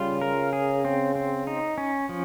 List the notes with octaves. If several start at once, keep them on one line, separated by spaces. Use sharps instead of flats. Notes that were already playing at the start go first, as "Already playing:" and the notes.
Already playing: C#3 G3 F4
A#4
G#4
C4
C4
D#4
C#4
F3